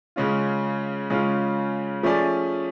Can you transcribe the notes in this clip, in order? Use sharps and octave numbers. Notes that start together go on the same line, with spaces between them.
C#3 G#3 C#4 F4
C#3 G#3 C#4 F4
F3 A3 C#4 G#4 D5